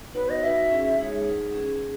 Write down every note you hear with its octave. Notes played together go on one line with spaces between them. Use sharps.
B3 D#4 F#4 B4 C#5 F#5
D#5
D#4 F#4 B4 E5 F#5
C#4 E4 G#4
G#3 D#4 G#4 C#5
D#4 G#4 B4 F#5
C#4 G#4 B4